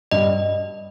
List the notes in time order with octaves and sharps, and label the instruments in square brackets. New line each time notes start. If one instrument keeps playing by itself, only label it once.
[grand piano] G2 [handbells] D#5